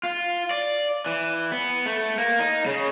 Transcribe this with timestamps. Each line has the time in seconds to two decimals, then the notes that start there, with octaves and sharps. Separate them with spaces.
0.03 F4
0.51 D5
1.06 E3
1.52 B3
1.86 A3
2.18 A#3
2.40 D#4
2.66 C#3